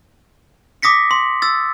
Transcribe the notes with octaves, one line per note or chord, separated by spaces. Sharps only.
D6 D#6 A#6 B6 C#7
C6
E6 A6